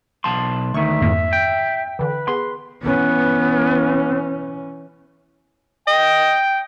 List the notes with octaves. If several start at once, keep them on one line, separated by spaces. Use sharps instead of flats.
B1 A5 C6
D2 D#3 E5 C#6
F2 G#2 A#3
G5
D3 E3 B4
B3 G#4 C6
E3 B3 C#4
D#5 G5